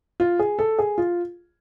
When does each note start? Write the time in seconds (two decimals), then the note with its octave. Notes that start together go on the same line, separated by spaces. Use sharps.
0.20 F4
0.39 G#4
0.59 A4
0.79 G#4
0.98 F4